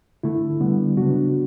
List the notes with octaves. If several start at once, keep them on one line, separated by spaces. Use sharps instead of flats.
D3 A3 E4
D3 G3 B3
C#3 F#3 B3 D4 F#4